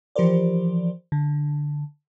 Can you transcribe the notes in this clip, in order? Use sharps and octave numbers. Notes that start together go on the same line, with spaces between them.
E3 F3 G4 A#4 C5 D5
D3